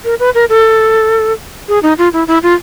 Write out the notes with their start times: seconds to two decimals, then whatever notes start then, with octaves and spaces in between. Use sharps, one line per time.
0.04 A#4
0.20 B4
0.35 A#4
0.49 A4
1.69 G#4
1.83 D#4
1.98 F4
2.13 E4
2.28 E4
2.43 F4